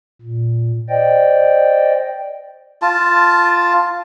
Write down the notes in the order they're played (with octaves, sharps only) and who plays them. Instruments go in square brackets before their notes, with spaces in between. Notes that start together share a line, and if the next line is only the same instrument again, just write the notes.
[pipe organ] A#2
C5 D5 D#5 G5
[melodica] F4 A5